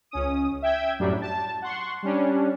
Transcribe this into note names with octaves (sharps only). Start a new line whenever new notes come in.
C#2 C#4 D#6
E5 G5 G#6
F#2 A2 F#3 G3 D4
A5
F#5 C6 C#6
G3 C#4 D4